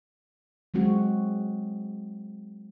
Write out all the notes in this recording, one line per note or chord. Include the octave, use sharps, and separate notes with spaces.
F#3 G#3 C4 F#4